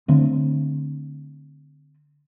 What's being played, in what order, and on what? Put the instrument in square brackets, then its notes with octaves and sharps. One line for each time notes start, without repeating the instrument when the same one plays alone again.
[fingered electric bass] D3 A3 C4